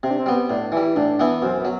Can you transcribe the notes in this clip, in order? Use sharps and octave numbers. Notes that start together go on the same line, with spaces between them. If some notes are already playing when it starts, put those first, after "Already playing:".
C3 C4
D4
C4
G3 B3
A2 D4
E3 G3 E4
A2 D4
E3 B3 E4
F#2 C4
B3
F#3